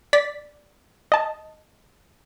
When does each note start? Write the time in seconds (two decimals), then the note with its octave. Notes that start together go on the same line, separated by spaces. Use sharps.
0.13 D5 A6 B6
1.12 D#5 A5